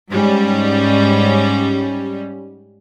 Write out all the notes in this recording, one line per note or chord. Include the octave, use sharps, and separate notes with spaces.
G#2 G3 C#4